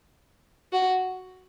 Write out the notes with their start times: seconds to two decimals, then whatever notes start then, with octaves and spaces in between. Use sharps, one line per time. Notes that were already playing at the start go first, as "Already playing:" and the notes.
0.72 F#4